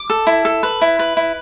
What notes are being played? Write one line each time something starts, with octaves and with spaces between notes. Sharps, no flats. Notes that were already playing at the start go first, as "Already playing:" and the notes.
Already playing: D6
A4
E4
A4
B4
E4
B4
E4